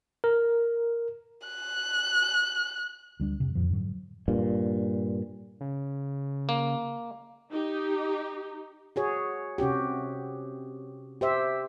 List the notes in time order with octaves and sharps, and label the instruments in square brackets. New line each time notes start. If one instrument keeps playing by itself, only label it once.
[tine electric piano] A#4
[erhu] F#6
[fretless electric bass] D2 G3 D4
F2 C3
F2 A#2 D3 F3
G#2 D3 F#3
G2 A#2
[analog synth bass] C#3
[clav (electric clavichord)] A#3
[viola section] D#4 G4
[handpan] F#4 G#4 C#5
C3 C#4 F#4 G4
G4 C5 E5